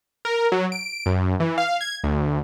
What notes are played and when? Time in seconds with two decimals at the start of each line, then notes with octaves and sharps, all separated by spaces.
0.25 A#4
0.52 F#3
0.72 D7
1.06 F#2
1.40 E3
1.58 F5
1.81 G#6
2.04 D2